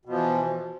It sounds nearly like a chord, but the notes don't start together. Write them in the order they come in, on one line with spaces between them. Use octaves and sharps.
B2 F3 E3